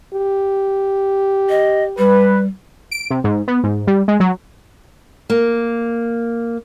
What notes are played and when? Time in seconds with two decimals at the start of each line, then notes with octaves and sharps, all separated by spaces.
0.14 G4
1.49 D#5
1.98 G3 B4
2.91 D7
3.10 C3
3.24 G#2
3.48 B3
3.64 G#2
3.87 G3
4.08 G#3
4.20 F#3
5.30 A#3